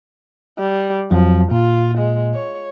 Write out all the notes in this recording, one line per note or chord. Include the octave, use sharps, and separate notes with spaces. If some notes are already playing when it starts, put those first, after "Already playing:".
G3
F2 F3 F#3
A#2 F4
G#3
C#5